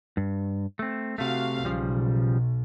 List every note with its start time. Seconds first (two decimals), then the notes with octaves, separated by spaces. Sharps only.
0.17 G2
0.79 A3 C4
1.18 C3 A3 F#4 F5
1.65 B1 C#3 F3 G3